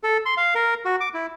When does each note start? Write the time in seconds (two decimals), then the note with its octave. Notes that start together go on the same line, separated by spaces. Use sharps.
0.03 A4
0.26 C6
0.37 F5
0.55 A#4
0.85 F#4
1.01 D6
1.14 E4